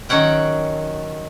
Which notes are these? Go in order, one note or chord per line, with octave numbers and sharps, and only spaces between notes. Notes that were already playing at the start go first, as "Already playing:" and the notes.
D#3 F#3 C#4 F#5 G5